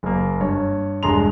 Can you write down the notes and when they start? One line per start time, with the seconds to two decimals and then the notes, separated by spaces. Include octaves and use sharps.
0.03 F#1 A#3
0.40 G2 C#5
1.03 E1 G2 G#3 A#5 C6 F7